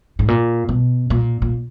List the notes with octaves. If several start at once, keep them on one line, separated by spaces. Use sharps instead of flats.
G#2
A#2
B2
A#2
A#2